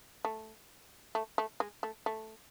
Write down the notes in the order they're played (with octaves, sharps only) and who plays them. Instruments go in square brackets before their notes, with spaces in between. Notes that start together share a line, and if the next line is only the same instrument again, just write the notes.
[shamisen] A3
A3
A3
G#3
A3
A3